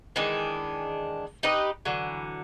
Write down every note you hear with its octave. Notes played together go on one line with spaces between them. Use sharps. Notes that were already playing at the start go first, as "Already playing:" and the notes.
D#3 E3 G#3 D4
D#4 G4 B4 D#5
D3 E3 F#3